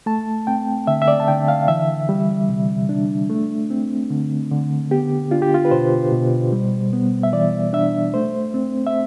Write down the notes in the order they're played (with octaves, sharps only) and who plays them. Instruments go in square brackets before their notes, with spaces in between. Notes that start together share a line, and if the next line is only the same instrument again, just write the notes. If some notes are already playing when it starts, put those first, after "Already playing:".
[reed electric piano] A3 A5
C4 G5
D3 E5
E5
D5
A5
D3 G5
F5
E3 E5
G3
C3
D4
A3
C4
D3
D3
B3 G4
D4 F4
G4
F4
B4
B2 C5
B2
G3
B3
E5
E3 D5
D4 E5
A3 C5
C4
E5